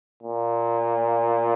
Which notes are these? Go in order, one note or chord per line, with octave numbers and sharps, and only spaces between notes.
A#2